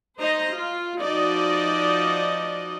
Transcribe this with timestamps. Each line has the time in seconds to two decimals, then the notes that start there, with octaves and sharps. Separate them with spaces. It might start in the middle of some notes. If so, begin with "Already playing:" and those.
0.19 D#4 C5 D#5 A#5
0.53 F4
1.01 F3 D#4 F#4 D5 D#5